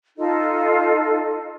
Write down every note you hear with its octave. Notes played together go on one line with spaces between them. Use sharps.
D#4 F4 A4 D#5